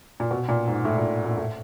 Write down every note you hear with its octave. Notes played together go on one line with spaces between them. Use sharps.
A#2
B2
A#2
G#2
A2
A#2
A#2
A2